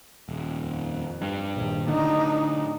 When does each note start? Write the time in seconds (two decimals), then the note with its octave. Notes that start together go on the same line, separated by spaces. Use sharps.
0.29 D#1
0.60 F2
1.22 G2
1.55 A#1 D#2
1.87 A2 D3 A3 D4 D#4